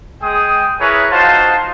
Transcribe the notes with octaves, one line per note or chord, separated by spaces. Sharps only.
G#3 G#4 G5 D#6
E4 G#4 A#4 B4 C#5
D#4 F4 F#4 C5 F5 A5